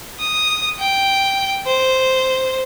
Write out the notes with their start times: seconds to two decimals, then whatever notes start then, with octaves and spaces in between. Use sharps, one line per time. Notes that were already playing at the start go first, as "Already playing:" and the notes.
0.20 D#6
0.79 G5
1.66 C5